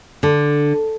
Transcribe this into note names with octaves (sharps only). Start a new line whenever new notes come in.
D3